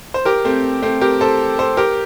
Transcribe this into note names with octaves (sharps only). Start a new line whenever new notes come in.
C5
G4 A#4
A3 C4
A3 C4
G4 A#4
A4 C5
A4 C5
G4 A#4